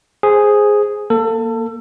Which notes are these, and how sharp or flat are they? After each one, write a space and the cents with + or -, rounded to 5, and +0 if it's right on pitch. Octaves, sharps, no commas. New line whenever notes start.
G#4 +0 C5 +0
A#3 +0 A4 +25